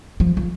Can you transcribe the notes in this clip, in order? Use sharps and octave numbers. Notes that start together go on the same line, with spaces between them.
F3
F3